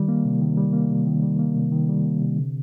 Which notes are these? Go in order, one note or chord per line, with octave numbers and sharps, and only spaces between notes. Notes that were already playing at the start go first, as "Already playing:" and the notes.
Already playing: D#3 G3
A#3
C3
D#3
G3
A#3
C3
D#3
G3
A#3
C3
D#3
G3
A#3
C3
D3